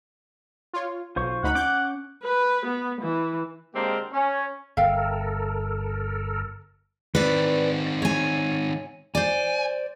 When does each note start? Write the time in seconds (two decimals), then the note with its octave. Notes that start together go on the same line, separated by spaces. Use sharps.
0.74 F4 C#5
1.16 B1 F4 C5 C#6
1.43 D2 D#4 F#5 B5
1.55 C#4 D6 F#6 G6
2.24 B4
2.66 B3
3.01 E3
3.74 D3 G#3 A#3 C4 G4 A#4
4.12 C#4
4.77 G1 A4 A#4 E5 F5 G5
7.15 D#3 C4 B4 D5
8.02 C#5 G#5
9.15 C5 D5 G#5